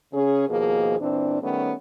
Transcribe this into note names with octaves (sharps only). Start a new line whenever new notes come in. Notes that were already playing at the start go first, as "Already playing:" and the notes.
C#3 C#4 G#4
D#2 B2 F3 A#3 G#4
A#2 E3 C4 D4
D#3 G3 A3 B3 C#4